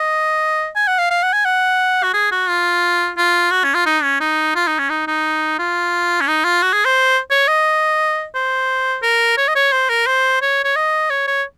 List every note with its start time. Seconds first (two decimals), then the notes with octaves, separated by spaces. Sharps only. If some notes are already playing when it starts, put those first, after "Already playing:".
Already playing: D#5
0.76 G#5
0.88 F#5
0.99 F5
1.11 F5
1.23 F#5
1.33 G#5
1.45 F#5
2.03 F#4
2.14 G#4
2.32 F#4
2.49 F4
3.18 F4
3.51 F#4
3.64 C#4
3.75 F4
3.86 D#4
4.03 C#4
4.21 D#4
4.56 F4
4.67 D#4
4.79 C#4
4.90 D#4
5.08 D#4
5.59 F4
6.21 C#4
6.28 D#4
6.45 F4
6.62 F#4
6.73 G#4
6.85 C5
7.31 C#5
7.48 D#5
8.35 C5
9.03 A#4
9.38 C#5
9.48 D#5
9.55 C#5
9.72 C5
9.90 A#4
10.07 C5
10.42 C#5
10.65 C#5
10.76 D#5
11.10 C#5
11.28 C#5